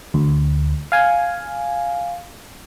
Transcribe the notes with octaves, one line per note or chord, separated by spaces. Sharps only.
D2
F5 G#5